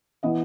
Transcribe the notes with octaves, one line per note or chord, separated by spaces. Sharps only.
E3 B3 D#5